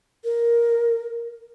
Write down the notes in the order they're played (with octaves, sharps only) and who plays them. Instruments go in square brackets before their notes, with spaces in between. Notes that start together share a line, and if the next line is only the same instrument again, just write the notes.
[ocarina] A#4